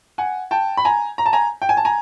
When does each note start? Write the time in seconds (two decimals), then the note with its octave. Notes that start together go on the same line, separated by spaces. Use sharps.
0.18 F#5 G#5
0.51 G5 A5
0.77 B5
0.85 G#5 A#5
1.18 A#5
1.26 A5
1.33 G#5 A#5
1.62 G5
1.69 G#5
1.77 A5
1.85 G#5 A#5